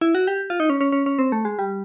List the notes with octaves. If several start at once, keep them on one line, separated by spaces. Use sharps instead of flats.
E4
F#4
G4
F4
D#4
C#4
C#4
C#4
C#4
C4
A3
G#3
G3